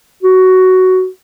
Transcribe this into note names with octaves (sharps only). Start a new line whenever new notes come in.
F#4